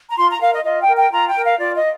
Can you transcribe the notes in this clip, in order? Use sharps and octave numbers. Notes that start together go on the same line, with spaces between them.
A#5
F4 C6
A#5
A#4 F5
D#5
F4 D#5
G5
A#4
G5
F4 A#5
G5
A#4
F5
F4 D5
D#5